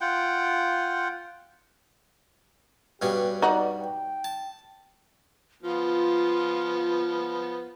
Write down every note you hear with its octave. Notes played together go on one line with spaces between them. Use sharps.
F4 F#5 G5
G2 B2 C#4 G4
D#4 F#4 D5
G5
A5
F3 B3 F4